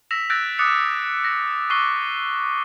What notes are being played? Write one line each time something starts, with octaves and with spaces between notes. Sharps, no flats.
E6 A#6 B6 E7 F7
E6 F#6 G6 A6 A#6 D7
D6 D#6 F#6 A6 C#7 F7
A#6
C#6 D6 F#6 C7 G7